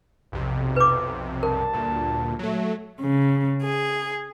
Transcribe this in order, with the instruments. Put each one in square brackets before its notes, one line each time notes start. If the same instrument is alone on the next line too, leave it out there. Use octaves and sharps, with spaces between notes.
[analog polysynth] B1 F2 C3
[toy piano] B4 D6
[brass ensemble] G2 D4 A5 [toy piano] A#4
[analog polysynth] D2 A#2
F#3 A3
[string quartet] C#3
G#4